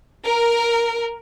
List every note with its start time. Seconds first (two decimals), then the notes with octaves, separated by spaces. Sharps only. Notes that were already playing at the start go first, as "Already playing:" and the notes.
0.24 A#4